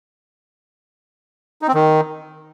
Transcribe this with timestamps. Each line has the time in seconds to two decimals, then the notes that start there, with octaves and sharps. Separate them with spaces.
1.62 D#4
1.68 C4
1.74 D#3